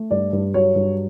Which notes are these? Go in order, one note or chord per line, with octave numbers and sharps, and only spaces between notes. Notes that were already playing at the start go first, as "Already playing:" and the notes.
Already playing: A3
G2 D5
G2
F#3 C#5
G2